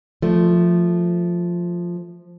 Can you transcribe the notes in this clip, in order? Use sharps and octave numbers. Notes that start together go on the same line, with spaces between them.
F3 A3